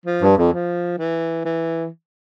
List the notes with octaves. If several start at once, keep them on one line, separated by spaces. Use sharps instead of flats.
F3
G2
F2
F3
E3
E3